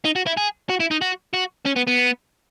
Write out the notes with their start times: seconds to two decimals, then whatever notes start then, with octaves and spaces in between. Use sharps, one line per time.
0.05 D#4
0.16 F#4
0.27 E4
0.37 G#4
0.69 F#4
0.80 E4
0.91 D#4
1.01 F#4
1.33 F#4
1.66 C#4
1.76 B3
1.87 B3